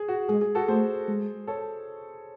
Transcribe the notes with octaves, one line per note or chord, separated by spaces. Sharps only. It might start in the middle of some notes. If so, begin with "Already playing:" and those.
Already playing: G#4
F#4
G#3 G#4
G#4
F#4 A4
A3 G#4 C5
G#3
A4 C#5